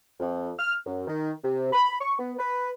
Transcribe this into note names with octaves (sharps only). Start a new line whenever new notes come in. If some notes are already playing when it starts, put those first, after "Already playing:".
F2
F6
F#2
D#3
C3
B5
C#6
B3
B4